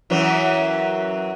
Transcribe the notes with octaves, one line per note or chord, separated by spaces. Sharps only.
F#2 E3 F#3